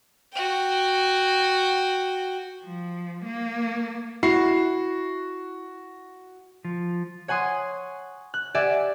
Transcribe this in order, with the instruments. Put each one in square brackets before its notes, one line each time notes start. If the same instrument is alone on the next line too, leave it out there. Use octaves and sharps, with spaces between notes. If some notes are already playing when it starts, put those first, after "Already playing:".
[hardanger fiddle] F#4 G5
[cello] F3
A#3
[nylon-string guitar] E4 [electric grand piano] F#4 C#6 C7
[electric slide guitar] F3
[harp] C#5 F#5 G#5 C6 D#6
F#6
G4 D5 E5 F#5 G#5